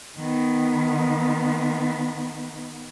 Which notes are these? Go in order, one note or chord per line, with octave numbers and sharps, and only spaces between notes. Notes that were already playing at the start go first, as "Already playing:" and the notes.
D#3 B3